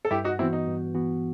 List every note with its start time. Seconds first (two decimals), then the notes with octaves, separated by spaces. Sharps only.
0.05 A4
0.11 G2 E4 G4
0.24 D#4 F#4
0.39 E3 B3 C4 E4 F#4
0.53 D#4
0.66 G2
0.95 E3 B3 F#4